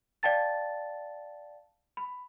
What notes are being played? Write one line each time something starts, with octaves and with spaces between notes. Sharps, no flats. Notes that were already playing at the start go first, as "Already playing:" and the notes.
D5 F5 G5 A5 A6
B5